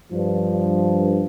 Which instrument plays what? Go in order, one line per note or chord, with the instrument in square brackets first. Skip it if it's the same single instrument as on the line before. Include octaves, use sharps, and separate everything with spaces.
[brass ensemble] G2 F3